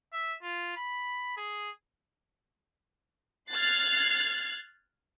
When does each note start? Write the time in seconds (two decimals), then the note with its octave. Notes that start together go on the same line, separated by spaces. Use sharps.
0.13 E5
0.43 F4
0.77 B5
1.37 G#4
3.50 F6 F#6 G#6 A6 C7